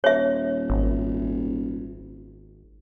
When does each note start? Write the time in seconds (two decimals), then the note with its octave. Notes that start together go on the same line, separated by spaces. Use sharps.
0.04 D#1 C#5 E5
0.70 G#1